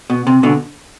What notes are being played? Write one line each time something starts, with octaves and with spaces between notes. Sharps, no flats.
B2
C3
B2 D3